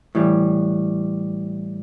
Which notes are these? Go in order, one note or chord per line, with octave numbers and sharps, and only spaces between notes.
A2 E3 G3